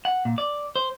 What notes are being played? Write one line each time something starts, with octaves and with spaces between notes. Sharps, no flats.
F#5
A#2
D5
C5